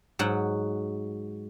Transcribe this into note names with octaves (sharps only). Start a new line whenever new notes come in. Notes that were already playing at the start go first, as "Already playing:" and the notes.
G#2 F#3 F#5